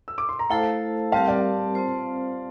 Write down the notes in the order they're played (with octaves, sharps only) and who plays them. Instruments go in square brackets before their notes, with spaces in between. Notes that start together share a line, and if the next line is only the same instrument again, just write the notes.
[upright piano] E6
D6
C6
A#5
[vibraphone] A3 E4 A4 C5 [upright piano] F5 A5
[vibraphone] G3 C4 G4 A#4 [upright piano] F5 A5
[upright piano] D5 F5
[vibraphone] C4 F4 C5